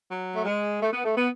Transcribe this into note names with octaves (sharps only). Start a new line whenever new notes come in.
F#3
A3
G#3
A3
B3
A3
B3